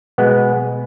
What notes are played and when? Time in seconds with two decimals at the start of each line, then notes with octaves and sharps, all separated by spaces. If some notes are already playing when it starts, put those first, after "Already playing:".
0.18 B2 G#3 B3